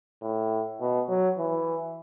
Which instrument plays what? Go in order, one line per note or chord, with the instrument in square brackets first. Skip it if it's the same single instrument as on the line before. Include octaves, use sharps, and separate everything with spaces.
[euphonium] A2
B2
F#3
E3